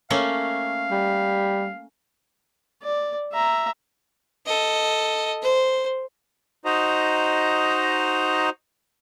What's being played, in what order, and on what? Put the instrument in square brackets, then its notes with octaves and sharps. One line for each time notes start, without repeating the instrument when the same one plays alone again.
[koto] A3 A#3 C#4 [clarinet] F5
[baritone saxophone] G3
[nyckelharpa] D5
E5 A#5
[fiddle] A4 D#5
C5
[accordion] D#4 F#4 C5 D#5 A#5